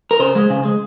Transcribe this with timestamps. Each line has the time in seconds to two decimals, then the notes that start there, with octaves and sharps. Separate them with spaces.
0.11 A#4
0.20 C#3 C5
0.35 G#3
0.50 C#3
0.65 G#3